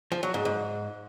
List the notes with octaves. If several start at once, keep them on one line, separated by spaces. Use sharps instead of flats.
F3
F#3
G#2
G#2